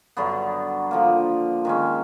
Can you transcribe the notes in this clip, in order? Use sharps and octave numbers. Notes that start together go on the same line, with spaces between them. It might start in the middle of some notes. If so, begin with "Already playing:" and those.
G2 D3 F#3 B3
D3 F3 A#3
D#3 G#3 C#4